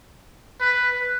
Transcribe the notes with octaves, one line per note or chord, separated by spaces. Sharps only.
B4